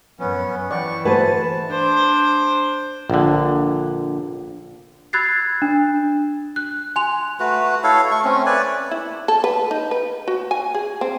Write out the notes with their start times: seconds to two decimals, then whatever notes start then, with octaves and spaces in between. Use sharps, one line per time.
0.20 F#2 B3 C#4
0.71 E3 D5 F#5 G5 C#6
1.05 A3 F#4 B4 C5 G#5 A5
1.70 D4 C5
3.10 A#1 D3
5.13 B5 E6 F#6 G#6 A6 C7
5.62 D4
6.56 F#6
6.96 G#5 C6 F7
7.40 A3 F#4 B4
7.84 E4 A4 C#5 F5
8.11 A3 C#6
8.25 A3 C4 C#4
8.46 B4 C#5 D5 G#5
8.91 E4
9.28 A4
9.44 B4
9.71 D#4
9.91 B4
10.28 F#4
10.51 G#5
10.75 G#4
11.01 C4